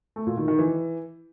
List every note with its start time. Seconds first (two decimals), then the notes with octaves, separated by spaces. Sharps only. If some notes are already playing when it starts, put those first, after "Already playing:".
0.16 A3
0.27 A#2
0.37 D#3
0.48 D#3
0.59 E3